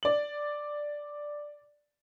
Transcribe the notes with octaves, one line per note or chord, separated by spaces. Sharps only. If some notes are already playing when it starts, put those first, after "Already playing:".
D5 F#7